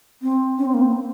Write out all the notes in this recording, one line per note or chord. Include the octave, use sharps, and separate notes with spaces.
C4
C#4
C4
A#3
C4